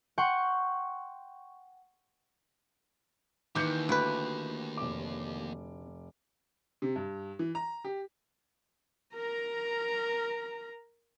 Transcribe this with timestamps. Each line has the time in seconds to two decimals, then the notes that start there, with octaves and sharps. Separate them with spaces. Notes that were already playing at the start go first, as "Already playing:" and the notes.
0.18 F#5 G5 C6 C#6
3.55 D#2 D#3 E3 D6 G6 C#7
3.89 D2 E4 B4
4.77 F1 D6
6.82 C3
6.96 G2
7.39 E3
7.55 A#5
7.85 G4
9.15 A#4 A#5